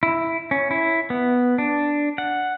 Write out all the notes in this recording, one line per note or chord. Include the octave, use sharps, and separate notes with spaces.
E4
C#4
E4
B3
D4
F#5